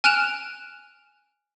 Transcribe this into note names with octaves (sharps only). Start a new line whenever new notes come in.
G#5 F6 F#6 D7 E7 F7